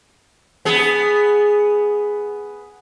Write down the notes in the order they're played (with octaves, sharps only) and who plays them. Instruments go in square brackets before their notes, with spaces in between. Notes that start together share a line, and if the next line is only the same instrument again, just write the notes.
[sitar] B3 G#4